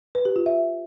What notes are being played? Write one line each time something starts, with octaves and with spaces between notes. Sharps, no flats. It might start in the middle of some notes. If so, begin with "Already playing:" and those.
B4
G4
F4
E5